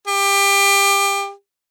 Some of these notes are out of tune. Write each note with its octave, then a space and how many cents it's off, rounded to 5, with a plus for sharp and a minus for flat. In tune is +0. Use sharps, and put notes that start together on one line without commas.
G4 +25